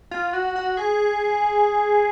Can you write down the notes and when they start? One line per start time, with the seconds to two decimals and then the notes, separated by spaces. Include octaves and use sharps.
0.11 F4
0.33 F#4
0.56 F#4
0.77 G#4